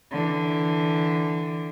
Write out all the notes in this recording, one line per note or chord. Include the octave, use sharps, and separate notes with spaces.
D3 E3